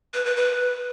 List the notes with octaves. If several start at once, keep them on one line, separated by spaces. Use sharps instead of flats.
B4
B4
B4